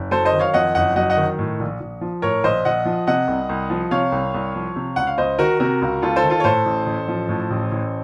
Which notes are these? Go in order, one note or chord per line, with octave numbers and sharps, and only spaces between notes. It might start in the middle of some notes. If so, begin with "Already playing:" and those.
Already playing: F#1
F#3 A4 C5
C5 D#5
D#3
C#5 F5
F2 D#5 F#5
F#1 D#5 F#5
F#3 D#5 F#5
D#5 F#5
D#3
A2
A#1
A#1
F3
A2 A#4 C#5
A#1 C5 D#5
A#1 D#5 F#5
F3
C3 D#5 F#5
C2
C2
F3
C3 C#5 F5
C2
C2
F3
C3
C#2 F#5
F5
C#2 C5 D#5
D#3 F#4 A#4
C3 F#4 A#4
C#2
C#2 F4 A4
A4 C5
D#3
F4 A4
C#5
A2 A4 C5
A1
A1
F3
A2
A1
A1